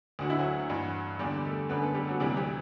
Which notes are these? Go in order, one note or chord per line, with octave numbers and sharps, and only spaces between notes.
D2 D3 F#4
E4
F#3 F#4
G2 E3
E2 D3 G3 G4
A3 A4
F#2 D3 B3 B4
A3 A4
G3 G4
F#3 F#4
D2 C3 E3 G3 G4
G3 G4